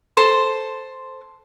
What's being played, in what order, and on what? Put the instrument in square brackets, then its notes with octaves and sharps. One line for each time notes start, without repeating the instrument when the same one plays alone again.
[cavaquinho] A4 C5 C6